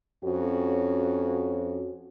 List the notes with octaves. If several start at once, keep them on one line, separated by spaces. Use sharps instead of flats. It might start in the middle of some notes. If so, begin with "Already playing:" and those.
F2 C#4 F#4